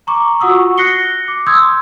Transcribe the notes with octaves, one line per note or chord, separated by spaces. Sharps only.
A#5 C#6 D6
F4 F#4 F#5 C#6 D#6 E6
F#6 A#6 C7 C#7 G7
D6
C6 D#6 E6 G6 G#6